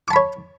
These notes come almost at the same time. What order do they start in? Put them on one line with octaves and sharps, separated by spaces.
D6 A5 B5 C#5